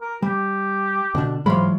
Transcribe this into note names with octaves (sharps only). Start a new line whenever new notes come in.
A#4
G3 G4
B2 D3 D4
G#2 E3 F#3 G#3 F4 B5